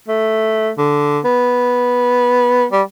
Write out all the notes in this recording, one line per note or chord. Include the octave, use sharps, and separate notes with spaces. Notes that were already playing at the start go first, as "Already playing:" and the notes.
A3
D3
B3
G3